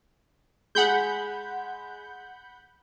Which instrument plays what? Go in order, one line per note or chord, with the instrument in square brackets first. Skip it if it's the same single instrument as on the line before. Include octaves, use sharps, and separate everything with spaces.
[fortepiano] G#3 G#4 [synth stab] F#5 B5 G6